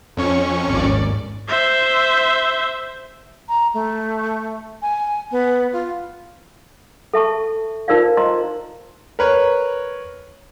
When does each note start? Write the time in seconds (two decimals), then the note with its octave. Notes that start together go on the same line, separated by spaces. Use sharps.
0.17 F2 C#4 C#6
0.67 G#1 D#2 D5
1.48 C5 E5
3.49 A#5
3.74 A3
4.82 G#5
5.32 B3
5.73 F4
7.14 A4 E5 A5 C#6
7.88 D#4 F4 A#4 C5 D5 F5
8.17 C5 D#5 A#5 C6
9.19 A#4 B4 C#5